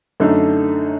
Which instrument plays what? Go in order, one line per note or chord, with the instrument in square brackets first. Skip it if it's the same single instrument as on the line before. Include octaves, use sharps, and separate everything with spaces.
[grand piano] F#2 D3 A3 D#4